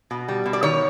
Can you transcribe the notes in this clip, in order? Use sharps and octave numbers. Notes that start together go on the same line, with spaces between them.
B2
G3
B2
D5
D#3 C#5